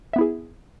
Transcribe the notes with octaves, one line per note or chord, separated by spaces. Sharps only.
B3 E4 G#4 E5